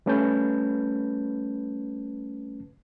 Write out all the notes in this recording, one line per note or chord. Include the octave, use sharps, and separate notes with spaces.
G3 A3 C#4 B4 A5 G6